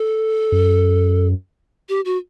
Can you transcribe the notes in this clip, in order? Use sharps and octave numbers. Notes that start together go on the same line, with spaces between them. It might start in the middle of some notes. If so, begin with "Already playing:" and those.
Already playing: A4
F#2
G4
F#4